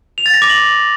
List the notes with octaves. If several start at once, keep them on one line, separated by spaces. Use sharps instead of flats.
F7
A6
A#6
D6
F#7